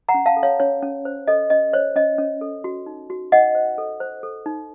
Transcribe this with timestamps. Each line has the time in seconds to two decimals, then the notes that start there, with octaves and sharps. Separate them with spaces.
0.09 F#5 A#5
0.14 C#4
0.26 F5 A5
0.37 A4
0.43 C#5 F5
0.60 C#4 C#5
0.82 C#4
1.05 C5
1.27 A4 D#5
1.50 C#4 D#5
1.73 C5 C#5
1.96 C#4 D#5
2.18 C#4
2.41 A4
2.64 F#4
2.86 D#4
3.10 F#4
3.32 D#4 D#5 F#5
3.55 C5
3.78 A4
4.00 C5
4.23 A4
4.46 D#4